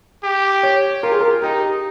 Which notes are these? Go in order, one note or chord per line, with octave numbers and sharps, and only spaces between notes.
G4
C#5
F4 A#4
G#4
A#4
D#4 G4